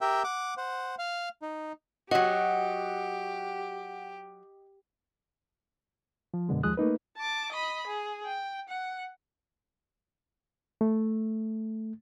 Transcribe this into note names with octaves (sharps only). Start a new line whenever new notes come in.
G4 A#4 E5 G5
F#5 D6
C5 F#5
F5
D#4
F#3 F#4 G4 D#5 F#5
F3
F#2 B2 D3 G#3
D#2 F3 G#3 D#6 F#6
A3 A#3 D#4 B4
A5 D6
D#5 B5
G#4
G5
F#5
A3